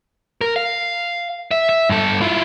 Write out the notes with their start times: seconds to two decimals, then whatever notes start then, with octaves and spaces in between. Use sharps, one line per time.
0.41 A#4
0.56 F5
1.51 E5
1.69 E5
1.90 G2 A4
2.21 E4 F4